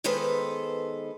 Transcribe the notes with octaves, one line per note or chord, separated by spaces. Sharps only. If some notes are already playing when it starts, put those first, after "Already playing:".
D#3 G#3 B3 A4 B4 C5